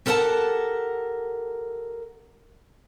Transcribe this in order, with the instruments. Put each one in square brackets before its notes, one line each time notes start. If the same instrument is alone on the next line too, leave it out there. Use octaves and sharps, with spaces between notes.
[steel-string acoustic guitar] G4 A4 A#4 C#5 F#5 A5